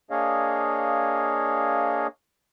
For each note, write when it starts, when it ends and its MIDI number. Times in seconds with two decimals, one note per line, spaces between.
0.11 2.07 58
0.11 2.07 62
0.11 2.07 68
0.11 2.07 73
0.11 2.07 75
0.11 2.07 77